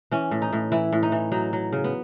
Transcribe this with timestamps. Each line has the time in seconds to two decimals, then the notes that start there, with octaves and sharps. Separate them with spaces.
0.11 E3 C#4
0.31 A2
0.42 D#4
0.53 A2
0.72 E3 E4
0.92 A2
1.03 D#4
1.12 E3
1.32 F#3 D#4
1.53 F#3
1.73 C#3
1.84 B3